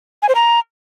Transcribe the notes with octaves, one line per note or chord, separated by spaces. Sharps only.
G#5
C5
A#5